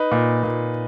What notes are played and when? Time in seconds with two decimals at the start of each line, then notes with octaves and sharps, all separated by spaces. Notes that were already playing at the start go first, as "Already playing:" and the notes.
Already playing: D#4 B4
0.11 A#2
0.43 A#2